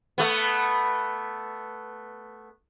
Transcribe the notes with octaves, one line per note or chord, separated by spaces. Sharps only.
A3 B3